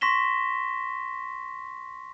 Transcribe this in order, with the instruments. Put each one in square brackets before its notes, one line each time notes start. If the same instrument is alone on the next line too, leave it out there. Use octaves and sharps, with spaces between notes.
[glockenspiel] C6 C#6 A#6 B6 E7 G7